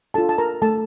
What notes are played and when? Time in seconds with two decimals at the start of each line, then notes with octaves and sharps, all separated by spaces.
0.14 D4 A4 A5
0.18 F4
0.29 A5
0.38 A#4 A#5
0.62 A3 A4 A5